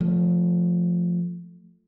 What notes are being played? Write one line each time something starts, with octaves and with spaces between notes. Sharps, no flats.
F3 A3